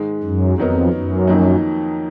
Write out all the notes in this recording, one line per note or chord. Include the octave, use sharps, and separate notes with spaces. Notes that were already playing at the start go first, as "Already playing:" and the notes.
Already playing: G#2 D#3 G#3
F#2
F2 D#3 F#3 B3 D#4 A#4
F#2
F2 D#3 F#3 A#3 D#4